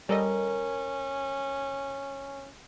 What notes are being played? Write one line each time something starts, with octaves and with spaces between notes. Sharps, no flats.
G3 C#4 A4 A#4 D#5